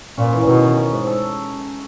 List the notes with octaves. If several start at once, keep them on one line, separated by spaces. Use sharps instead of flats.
A#2 C#4
E3
B2 D#3
D#3
C#4
G#2
A4